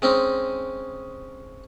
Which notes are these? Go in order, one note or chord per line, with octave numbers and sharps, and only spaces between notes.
G#3 C4 C#4 D#4